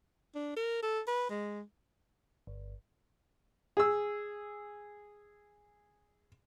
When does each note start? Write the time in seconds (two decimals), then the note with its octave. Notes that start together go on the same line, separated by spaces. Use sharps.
0.35 D4
0.56 A#4
0.83 A4
1.07 B4
1.30 G#3
2.47 G1
3.77 G#4 E6